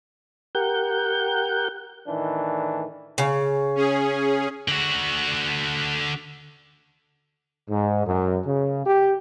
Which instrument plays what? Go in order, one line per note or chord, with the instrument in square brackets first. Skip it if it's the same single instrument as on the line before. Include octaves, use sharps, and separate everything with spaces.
[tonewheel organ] G4 A#4 F#5 G6
[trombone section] A2 D#3 E3 D4
[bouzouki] C#3
[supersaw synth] C#4 G#4
[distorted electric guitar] D3 F#4
[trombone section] G#2
F#2
C#3
G4